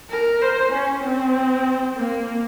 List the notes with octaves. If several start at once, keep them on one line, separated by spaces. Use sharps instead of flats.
A#4
C5
C#4
C4
A#3